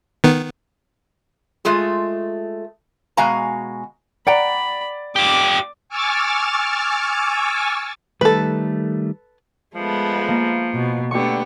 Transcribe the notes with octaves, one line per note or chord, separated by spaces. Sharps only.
D#3 B3
G#3 A3 F4 G#4
B2 G#3 F#4 F5 G#5 A#5
D5 F#5 G5 A#5 B5
F4 G4 D6
G#5 C#6 D6 E6 F6 A6
D#3 G3 A3 A4 B4
F3 G#3 A3 B3
A#3
B2
D3 A3 B3 D4 G4 C#6